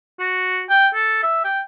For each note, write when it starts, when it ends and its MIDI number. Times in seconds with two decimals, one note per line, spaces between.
0.20 0.62 66
0.70 0.87 79
0.95 1.21 69
1.23 1.43 76
1.45 1.60 79